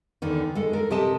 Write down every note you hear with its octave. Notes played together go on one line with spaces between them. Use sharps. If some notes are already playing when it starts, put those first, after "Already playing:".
E2 D3 D#3
G#3 A4
A4 A#4
C3 G4 D#5 A5